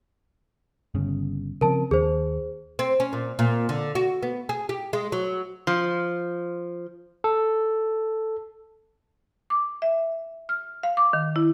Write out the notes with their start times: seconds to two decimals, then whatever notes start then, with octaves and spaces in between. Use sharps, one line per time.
0.95 G1 C#3
1.61 C#3 F3 C4 A#4 A5
1.91 D#2 G#4 C5
2.79 C4
3.00 C#4
3.13 A#2
3.39 A#2
3.69 D3
3.95 F#4
4.23 B3
4.49 G#4
4.69 G4
4.93 G#3
5.12 F#3
5.67 F3
7.24 A4
9.50 D6
9.82 E5
10.49 F6
10.83 F5
10.97 D6
11.13 D#3
11.36 E4